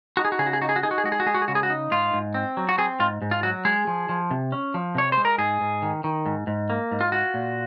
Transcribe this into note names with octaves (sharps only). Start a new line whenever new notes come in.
D#4 F#4
G#4
F#4
C#3 G#4
F#4
G#4
D#4 F#4
G#4
F#4
D#4 G#4
F#4
G#4
G#3 F#4
G#4
F#4
G#3 G#4
F#4
G#4
C#3 F#4
G#4
F#4
D#4
G#2 F4
G#2
C4
F#3
F#4
C4 G#4
G#2 F4
G#2
F4
F#3 F#4
G#3 G#4
F3
F3
C3
C#4
F3
C3 C#5
G#3 C5
A#4
G#2 G#4
G#2
D#3
D#3
G#2
G#2
A#3
G#2
F4
F4 F#4
A#2